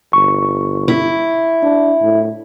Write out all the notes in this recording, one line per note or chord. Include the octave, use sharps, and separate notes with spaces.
G1 C#6
E4
D4
A2